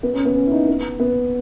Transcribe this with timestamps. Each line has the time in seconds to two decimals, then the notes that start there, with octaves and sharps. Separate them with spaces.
0.03 B3
0.14 C#4
0.25 B3
0.36 C#4
0.47 E4
0.52 D#4
0.68 B3
1.00 B3